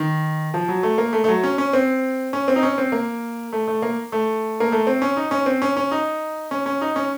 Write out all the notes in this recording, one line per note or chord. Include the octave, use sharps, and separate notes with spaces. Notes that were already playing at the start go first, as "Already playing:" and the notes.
Already playing: D#3
F3
F#3
A3
A#3
A3
A3
F#3
C#4
C#4
C4
C#4
C4
D#4
C#4
C4
A#3
A3
A3
A#3
A3
A#3
A3
C4
C#4
D#4
C#4
C4
C#4
C#4
D#4
C#4
C#4
D#4
C#4